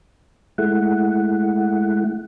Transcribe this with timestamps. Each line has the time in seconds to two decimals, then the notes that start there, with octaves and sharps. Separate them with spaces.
0.58 G#3 A3 E4 F#5